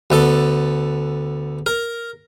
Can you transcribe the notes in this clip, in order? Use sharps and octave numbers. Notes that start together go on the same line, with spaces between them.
D2 B3 A4
A#4